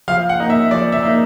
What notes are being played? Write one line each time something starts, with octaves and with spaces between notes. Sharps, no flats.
F3 F5
F#5
A#3 D#4
E5
F3 D5
E5
A#3 D#4